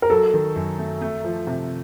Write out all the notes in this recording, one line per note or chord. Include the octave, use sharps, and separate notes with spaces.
A#4
F#3 A4
D#3
F#2
A3
A3
F3
C3